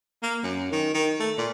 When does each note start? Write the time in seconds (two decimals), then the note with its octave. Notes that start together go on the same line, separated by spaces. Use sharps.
0.23 A#3
0.43 F#2
0.72 D#3
0.94 D#3
1.20 A3
1.38 A#2